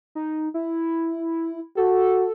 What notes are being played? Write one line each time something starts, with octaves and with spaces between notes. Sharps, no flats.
D#4
E4
F#4 A4